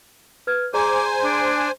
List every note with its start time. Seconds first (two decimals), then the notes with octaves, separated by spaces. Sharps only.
0.47 B4 F6 G#6
0.74 G#4 C5 D5 G#5 A#5 D6
1.22 D4